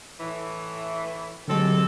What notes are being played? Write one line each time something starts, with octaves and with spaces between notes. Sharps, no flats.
A2 E3
D3 F#3 G#3 C4 G4 A4